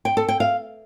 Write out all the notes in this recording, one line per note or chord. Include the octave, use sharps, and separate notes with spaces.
G5
A4
G5
F5